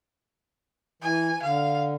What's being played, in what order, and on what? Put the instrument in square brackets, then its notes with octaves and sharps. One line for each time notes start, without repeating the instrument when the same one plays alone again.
[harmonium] E3 [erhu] G#5
[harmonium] D3 [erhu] F5